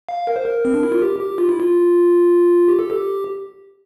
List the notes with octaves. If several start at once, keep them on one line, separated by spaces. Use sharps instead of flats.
F5
A#4
C5
A#4
C4
D4
E4
F4
G4
G4
F4
E4
F4
G4
A4
G4